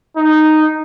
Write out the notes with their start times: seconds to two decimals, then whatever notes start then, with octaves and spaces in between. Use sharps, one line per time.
0.16 D#4